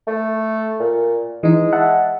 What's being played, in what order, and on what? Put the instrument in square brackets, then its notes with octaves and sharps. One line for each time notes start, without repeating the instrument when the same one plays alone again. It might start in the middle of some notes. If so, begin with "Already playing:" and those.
[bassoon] A3
A#2
[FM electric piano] E3 D#4 [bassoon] G#3
[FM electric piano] E5 F#5 A5